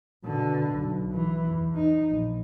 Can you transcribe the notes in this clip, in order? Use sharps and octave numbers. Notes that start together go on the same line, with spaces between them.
B2 D3
B1
E3
E2
D#4
A#1